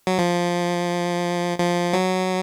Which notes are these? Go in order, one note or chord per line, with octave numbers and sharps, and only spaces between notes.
F#3
F3
F3
F#3